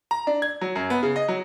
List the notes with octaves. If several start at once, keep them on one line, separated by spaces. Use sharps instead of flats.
A#5
D4
G#6
F#3
F#2
B3
C#3
D#5
F#3